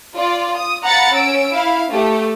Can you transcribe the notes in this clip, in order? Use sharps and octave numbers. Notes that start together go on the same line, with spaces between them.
F4 D5
D#6
F5 F#5 A#5 B5 A6 C#7
C#4 E6 D7
E4 F5
A3 G4